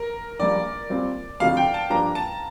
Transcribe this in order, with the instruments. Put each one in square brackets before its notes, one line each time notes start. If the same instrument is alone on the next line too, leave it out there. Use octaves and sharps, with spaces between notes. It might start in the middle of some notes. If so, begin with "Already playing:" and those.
Already playing: [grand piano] A#4
[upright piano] A#1 A#2 G3 [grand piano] D5
[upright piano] A#2 G3 C4
[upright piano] D2 C3 F3 A3 D#4 [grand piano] F5
[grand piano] G5
A5
[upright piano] G2 F3 A#3 D4 [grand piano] A#5
[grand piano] A5